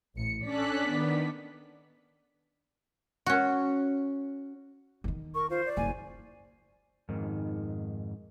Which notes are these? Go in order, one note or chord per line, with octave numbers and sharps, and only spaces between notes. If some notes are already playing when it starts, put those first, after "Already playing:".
A1 C#7
C#4 D4 A4 D5 F#6 B6
D#3 B3
C#4 F#4
D#3 E3
A#4 C#6
F4 C5
D5
F#1 G#5
F2 G#2 D#3